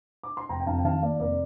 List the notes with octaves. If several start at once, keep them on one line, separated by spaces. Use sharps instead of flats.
D6
C6
F1 G5 A#5
G5
F2 F5 A5
G5
D#3 F5 A5
A#3 D5 F5
F1 A#4 D5